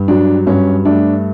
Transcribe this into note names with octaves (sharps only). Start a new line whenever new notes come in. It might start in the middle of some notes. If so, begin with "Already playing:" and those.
Already playing: G2
F#3 D4
G2 C#4
A3 D4